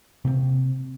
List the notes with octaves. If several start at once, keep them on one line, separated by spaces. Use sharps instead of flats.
C3 A#3 C4